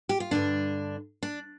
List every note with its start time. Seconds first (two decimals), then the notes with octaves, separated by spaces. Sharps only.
0.09 G4
0.20 F4
0.31 G2 D3 D4
1.23 D4